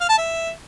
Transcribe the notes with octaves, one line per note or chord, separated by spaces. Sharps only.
F5
A5
E5